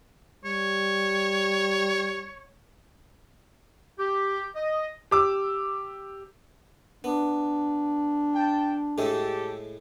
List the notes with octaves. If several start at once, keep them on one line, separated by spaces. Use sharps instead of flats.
G3 C#5
G4
D#5
G4 D6 E6
B3 D4
G5 A5
A2 G#3 A3 G4 A4